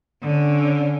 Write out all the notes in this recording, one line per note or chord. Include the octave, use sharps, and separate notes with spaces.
D3 C#4